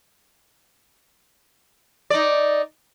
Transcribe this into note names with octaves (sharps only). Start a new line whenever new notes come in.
D#4 D5